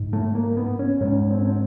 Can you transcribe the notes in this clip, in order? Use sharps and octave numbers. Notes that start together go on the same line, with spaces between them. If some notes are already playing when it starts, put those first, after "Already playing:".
Already playing: G#2
A3
A#3
B3
C#4
G#2 C#4
C4
C#4
C4